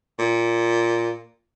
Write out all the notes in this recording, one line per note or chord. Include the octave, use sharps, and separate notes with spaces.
A#2